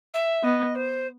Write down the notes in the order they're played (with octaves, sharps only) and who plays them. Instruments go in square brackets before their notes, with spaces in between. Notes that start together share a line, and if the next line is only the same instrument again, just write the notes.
[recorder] E5
[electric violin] B3 [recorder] D#5
[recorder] C5